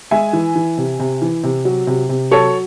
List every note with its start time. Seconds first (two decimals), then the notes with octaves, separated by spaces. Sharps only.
0.11 G#3 E5 G#5
0.33 E3
0.56 E3
0.78 C3
0.99 C3
1.22 E3
1.44 C3
1.65 F#3
1.87 C3
2.09 C3
2.31 F#3 A4 C#5